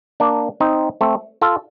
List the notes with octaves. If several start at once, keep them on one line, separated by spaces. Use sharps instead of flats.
A#3 D4
C4 D#4
A3 C4
F4 A4